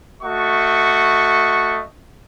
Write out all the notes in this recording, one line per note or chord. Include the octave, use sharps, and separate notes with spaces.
A3 F#4 D#5 C#6